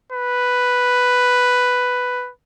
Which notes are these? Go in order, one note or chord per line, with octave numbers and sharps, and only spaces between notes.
B4